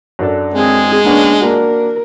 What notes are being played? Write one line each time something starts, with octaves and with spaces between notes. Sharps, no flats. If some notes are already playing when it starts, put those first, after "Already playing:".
F#2 D4 A4
G#3 C4 G#4
A#3 B3 C#4 D4
A#3 D4 F#4 A#4